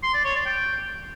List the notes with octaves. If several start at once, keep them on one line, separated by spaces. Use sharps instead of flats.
C6
D5
C#5
D5
G5